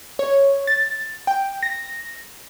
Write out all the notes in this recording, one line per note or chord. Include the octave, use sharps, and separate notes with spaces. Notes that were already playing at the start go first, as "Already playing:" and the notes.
C#5
A6
G5
A#6